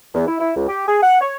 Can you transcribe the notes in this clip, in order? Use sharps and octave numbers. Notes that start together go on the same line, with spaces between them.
E2
E4
E4
C#2
G4
G#4
F#5
C#5